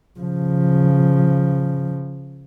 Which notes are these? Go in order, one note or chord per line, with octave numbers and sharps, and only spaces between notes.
C#3 F3